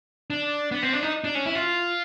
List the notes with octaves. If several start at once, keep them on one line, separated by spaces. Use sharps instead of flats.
D4
B3
C4
D4
D#4
D4
C#4
E4
F4